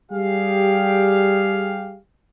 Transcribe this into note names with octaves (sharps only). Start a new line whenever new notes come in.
G3 G4 G#4 F5